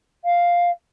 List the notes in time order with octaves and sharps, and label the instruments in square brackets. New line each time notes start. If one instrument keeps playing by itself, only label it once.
[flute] F5